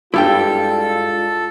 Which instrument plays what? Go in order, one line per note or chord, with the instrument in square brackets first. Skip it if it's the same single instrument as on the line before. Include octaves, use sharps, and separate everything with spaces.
[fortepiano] G2 [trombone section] G#3 D4 F4 [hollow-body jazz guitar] E4 G4 G5 [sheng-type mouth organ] A4